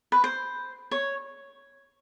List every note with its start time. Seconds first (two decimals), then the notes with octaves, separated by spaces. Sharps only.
0.12 B4
0.24 C5
0.91 C#5